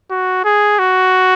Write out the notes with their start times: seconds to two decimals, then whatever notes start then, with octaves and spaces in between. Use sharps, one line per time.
0.11 F#4
0.45 G#4
0.79 F#4